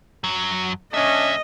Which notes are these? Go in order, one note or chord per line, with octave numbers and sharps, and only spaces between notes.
F#2 F#3
B1 C#4 D4 D#5 E5